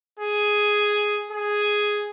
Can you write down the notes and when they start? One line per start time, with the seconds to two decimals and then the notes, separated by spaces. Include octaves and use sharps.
0.19 G#4
1.32 G#4